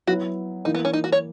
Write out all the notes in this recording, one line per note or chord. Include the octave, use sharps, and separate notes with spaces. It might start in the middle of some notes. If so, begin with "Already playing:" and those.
F#3 B3 E4 F#4
E3 A#3 D#4 E4
B3
C#4
D#4
F#4
C#5